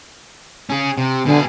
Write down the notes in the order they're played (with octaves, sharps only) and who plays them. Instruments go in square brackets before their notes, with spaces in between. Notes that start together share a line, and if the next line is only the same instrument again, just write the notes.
[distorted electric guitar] C#4 G#4
C3
[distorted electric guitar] B2 G#4 [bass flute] D3